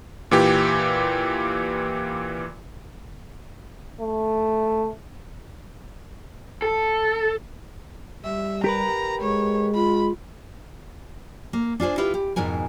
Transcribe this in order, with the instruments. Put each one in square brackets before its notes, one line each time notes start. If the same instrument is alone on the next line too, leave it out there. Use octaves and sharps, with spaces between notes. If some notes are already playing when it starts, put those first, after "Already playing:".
[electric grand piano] A#2 E3 G4
[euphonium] A3
[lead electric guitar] A4
[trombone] G3 [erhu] E5
[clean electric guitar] G4 A#4 B4 [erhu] A#5
[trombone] G#3 [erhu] C#5
[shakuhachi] F4 [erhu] B5
[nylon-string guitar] A#3
D4 F4 G#4 C5
E4 F4 G4 B4
G4
F2 G#2 B2 A#4 G#5